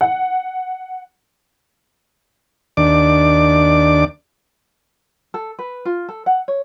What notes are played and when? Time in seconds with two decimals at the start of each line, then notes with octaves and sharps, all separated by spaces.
0.01 F#5
2.77 D#2 D4 D6
5.34 A4
5.59 B4
5.85 F4
6.09 A4
6.26 F#5
6.48 C#5